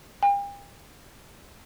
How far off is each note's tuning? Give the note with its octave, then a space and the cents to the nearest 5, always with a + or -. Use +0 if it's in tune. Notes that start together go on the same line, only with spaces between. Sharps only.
G5 +40